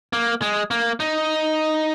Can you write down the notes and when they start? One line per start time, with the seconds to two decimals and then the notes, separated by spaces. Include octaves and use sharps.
0.13 A#3
0.42 G#3
0.71 A#3
1.00 D#4